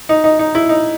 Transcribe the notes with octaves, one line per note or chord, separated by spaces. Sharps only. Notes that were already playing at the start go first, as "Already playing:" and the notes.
D#4
D#4
D#4
E4
D#4